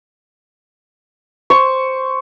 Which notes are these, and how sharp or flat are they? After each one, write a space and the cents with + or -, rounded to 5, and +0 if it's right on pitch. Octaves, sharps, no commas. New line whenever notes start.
C5 +0 C#6 +10